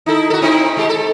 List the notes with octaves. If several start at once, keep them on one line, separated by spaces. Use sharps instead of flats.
D#4 E4 A4
F#4 A4
C4 D#4 E4
G#3 A3 G4
A4